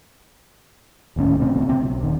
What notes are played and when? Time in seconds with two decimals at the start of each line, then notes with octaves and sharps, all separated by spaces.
1.16 D1 D#2 A2 C#4
1.39 C3 A3 C4
1.53 A1 D2 C4
1.66 C#3 C4
1.80 B1
2.03 D#1 D#3